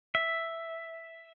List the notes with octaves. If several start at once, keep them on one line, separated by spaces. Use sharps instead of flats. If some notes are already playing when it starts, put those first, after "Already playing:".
E5